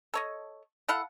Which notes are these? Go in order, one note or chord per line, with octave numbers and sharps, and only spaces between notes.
A4 C#5 D#5
E4 A4 F5 F#5